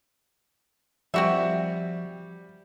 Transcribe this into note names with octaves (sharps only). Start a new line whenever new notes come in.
F3 G3 C4 F#4 E5